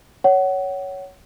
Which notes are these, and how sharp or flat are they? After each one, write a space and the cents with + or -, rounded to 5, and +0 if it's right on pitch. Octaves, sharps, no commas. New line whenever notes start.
C#5 +10 F#5 +25